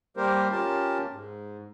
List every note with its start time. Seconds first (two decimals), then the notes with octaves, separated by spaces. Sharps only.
0.17 G3 A#3 G4 A#4 C5
0.51 C#4 F4 G4 A#4 A5
1.11 G#2